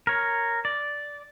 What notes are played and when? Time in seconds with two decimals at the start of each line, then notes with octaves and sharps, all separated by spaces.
0.07 A#4 C#5
0.65 D5